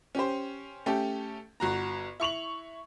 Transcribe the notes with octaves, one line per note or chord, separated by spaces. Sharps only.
C#4 G4 C5
A3 C#4 G4 A4
G1 F#4 A#5
E4 C#6 F7 F#7